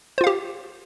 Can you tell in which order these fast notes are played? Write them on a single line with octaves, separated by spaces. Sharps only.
C5 F4 F5 G4